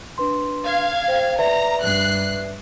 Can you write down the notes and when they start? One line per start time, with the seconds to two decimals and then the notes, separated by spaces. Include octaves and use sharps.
0.18 D4 B4 C6
0.65 F5 G#6
1.08 C5 G5
1.39 B4 D5 E5 A#5
1.81 G2 F#6 C7